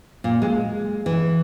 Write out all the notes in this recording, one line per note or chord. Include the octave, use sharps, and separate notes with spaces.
A#2
G#3
E3